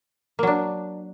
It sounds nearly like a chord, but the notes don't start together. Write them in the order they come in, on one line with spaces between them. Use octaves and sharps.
A#3 F#3 D4